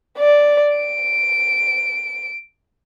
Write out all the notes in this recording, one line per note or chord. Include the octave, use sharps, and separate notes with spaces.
D5
D7